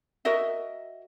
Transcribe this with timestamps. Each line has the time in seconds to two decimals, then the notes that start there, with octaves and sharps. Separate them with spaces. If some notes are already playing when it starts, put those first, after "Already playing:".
0.25 F#4 A#4 D#5 E5